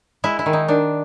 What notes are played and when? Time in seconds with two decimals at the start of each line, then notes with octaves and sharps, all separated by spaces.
0.24 G#3 E4
0.39 E4
0.46 D#3
0.53 D#4
0.68 D#3 D4